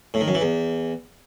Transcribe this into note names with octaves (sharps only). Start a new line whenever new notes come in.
A2
D#3
F#2
E3
E2